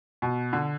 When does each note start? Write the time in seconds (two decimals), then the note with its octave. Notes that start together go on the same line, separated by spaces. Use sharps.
0.22 B2
0.53 D3